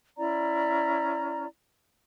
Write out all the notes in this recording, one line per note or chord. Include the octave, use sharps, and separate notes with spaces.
C#4 E4 D5 A#5